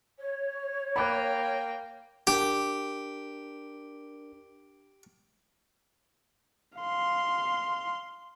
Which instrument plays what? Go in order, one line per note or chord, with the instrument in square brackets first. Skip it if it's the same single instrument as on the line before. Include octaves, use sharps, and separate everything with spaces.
[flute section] C#5
[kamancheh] A#3 G5 [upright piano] B5 D6 F#6
[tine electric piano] D4 A#4 [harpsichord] G4
[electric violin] F5 C6